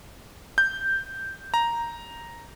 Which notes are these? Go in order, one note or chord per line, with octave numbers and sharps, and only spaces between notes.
G6
A#5